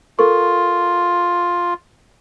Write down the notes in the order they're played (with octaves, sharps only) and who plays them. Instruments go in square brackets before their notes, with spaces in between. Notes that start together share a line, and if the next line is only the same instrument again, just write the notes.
[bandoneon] F4 [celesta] A4 A#4 C#6